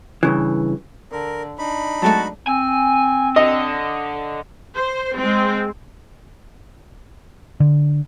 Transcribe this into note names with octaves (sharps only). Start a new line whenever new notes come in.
G2 C#3 E3
D3 A#4
D4 D#4 B5
F#3 G#3 A3 C4 F#4 A5
C4 G#5
D3 D#5
C5
G#3 C4
D3